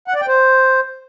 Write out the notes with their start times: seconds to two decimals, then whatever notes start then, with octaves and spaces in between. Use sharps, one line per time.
0.08 F#5
0.14 D5
0.21 G5
0.28 C5